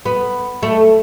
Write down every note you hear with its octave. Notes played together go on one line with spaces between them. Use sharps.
B3
A3